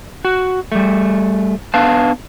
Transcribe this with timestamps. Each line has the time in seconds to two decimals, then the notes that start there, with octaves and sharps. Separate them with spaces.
0.25 F#4
0.72 G3 A3
1.74 B3 D4 B4 F5 A5